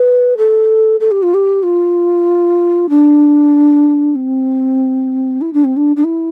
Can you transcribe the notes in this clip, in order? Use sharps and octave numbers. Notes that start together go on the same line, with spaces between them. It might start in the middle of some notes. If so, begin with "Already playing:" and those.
Already playing: B4
A4
A4
G4
F4
G4
F4
D4
C4
E4
D4
C4
D4
D4
E4